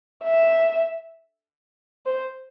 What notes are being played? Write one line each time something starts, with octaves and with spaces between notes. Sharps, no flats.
E5
C5